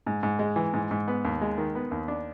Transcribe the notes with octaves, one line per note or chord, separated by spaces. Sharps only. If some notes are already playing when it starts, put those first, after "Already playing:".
G#2
G#2
G#3
E3
G#2
G#2
B3
D#2
G#3
D#3
B3
D#2
D4